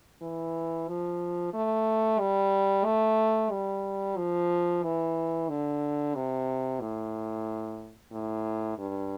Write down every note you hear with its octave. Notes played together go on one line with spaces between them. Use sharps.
E3
F3
A3
G3
A3
G3
F3
E3
D3
C3
A2
A2
G2